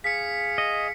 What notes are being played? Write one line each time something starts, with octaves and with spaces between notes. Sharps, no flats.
G#4 F5 B6 C#7
D#5